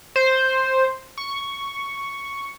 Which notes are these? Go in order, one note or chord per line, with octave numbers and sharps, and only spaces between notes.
C5
C#6